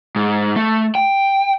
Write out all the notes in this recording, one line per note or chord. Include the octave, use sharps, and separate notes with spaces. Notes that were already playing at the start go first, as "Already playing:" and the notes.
G#2
A3
G5